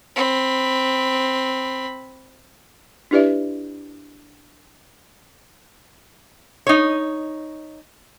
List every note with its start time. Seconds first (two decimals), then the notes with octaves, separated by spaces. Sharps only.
0.16 C4 B5
3.11 D4 E4 G4 B4 D5 E5
6.67 D#4 C#5